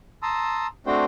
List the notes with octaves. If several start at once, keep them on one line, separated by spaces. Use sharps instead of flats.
A5 A#5 C6 D#6 E6
A3 C4 D4 F#4 C5 G5